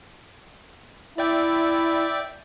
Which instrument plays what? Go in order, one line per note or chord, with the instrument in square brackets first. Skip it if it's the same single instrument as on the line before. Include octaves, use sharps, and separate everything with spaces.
[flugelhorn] E4 [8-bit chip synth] D5 E5 G5